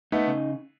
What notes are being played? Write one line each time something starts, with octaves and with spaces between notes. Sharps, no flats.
A3 B3 D#4
C#3